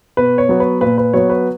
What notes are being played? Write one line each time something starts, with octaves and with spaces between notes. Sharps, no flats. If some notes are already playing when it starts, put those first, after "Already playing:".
B2 B4
C#5
F#3 B3
B4
A#2 B4
B4
F#3 B3 C#5
B4